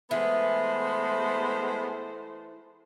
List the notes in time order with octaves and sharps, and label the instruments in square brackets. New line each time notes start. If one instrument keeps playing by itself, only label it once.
[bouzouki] E3 [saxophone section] G#3 B3 [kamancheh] A3 C5